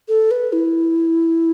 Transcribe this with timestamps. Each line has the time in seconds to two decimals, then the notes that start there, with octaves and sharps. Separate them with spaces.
0.08 A4
0.31 B4
0.53 E4